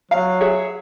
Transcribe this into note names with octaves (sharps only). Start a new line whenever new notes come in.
F#3 F5
G#4 C#5 E5